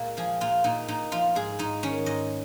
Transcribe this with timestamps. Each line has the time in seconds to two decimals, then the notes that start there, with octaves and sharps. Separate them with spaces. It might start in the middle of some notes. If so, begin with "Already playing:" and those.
Already playing: A#2 G#3 F4
0.17 F3 G#4
0.41 A#2 F4
0.64 A#2 D#4
0.88 A#2 D#4
1.12 F3 F4
1.35 G#2 G#4
1.59 G#2 D#4
1.83 D#3 C#4
2.06 G#2 D#5